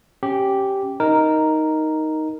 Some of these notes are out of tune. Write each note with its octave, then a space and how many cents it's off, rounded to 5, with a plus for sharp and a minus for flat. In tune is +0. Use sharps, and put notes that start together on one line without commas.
C#4 -15 G4 -5
D#4 +5 A#4 +0